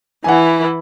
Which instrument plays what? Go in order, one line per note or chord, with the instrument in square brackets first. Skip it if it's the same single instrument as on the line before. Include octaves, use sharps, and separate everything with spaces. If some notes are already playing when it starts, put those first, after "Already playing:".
[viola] E3 E4 [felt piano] F#5 G#5